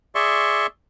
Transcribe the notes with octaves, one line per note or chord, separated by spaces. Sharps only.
G#4 D5 E5 C6 C#6